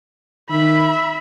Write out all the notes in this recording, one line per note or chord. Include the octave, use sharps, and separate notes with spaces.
D#3 E5 B5